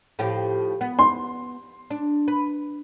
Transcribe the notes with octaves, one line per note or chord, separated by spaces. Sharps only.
A2 F3 G4
B3
C6
D4
B4